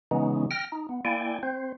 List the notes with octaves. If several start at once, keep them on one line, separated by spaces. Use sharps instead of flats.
C#3 E3 G#3 B3 C#4 D#4
G5 F6 A#6
D#4
B3
A#3 E4 D5 G5 G#5
C4 C5